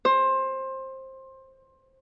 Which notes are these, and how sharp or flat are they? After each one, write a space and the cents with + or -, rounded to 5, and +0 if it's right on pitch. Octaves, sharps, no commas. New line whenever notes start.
C5 +20